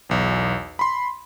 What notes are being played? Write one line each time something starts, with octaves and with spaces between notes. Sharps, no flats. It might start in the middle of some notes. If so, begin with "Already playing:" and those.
B1 E2
B5 C6